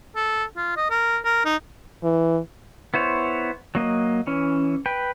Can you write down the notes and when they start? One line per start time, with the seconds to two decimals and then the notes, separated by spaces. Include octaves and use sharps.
0.15 A4
0.56 F4
0.77 D#5
0.90 A#4
1.25 A#4
1.45 D#4
2.03 E3
2.94 B3 E4 C5 C#5
3.75 F#3 A#3 D#5
4.27 E3 C#4
4.86 B4 G5